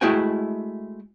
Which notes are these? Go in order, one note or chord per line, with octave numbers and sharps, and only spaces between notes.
G#3 A3 E4 F#4 G5 G#5